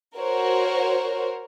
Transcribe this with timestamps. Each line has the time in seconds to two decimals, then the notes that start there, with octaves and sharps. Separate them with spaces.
0.18 F#4 A#4 C5 C#5